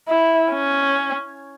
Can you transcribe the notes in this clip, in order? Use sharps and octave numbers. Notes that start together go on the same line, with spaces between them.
E4
C#4